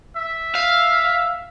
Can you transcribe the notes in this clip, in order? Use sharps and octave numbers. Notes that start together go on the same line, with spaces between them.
E5
F5